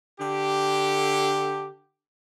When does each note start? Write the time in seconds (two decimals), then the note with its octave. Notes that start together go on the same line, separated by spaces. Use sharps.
0.21 D3 G4